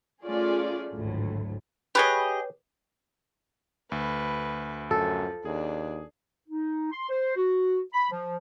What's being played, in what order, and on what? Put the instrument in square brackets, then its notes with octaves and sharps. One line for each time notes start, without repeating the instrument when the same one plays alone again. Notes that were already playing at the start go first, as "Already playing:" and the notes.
[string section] A3 C#4 F4 G#4 D5
G#1 D2 A2 F#3
[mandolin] G4 G#4 D#5 [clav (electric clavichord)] B4 C#5
[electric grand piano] D2 [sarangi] B4
[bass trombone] F#2 [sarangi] F3 [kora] A4
[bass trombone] D#2 [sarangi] D4 [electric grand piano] G#4
[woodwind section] D#4
C6
C5
F#4
B5
F3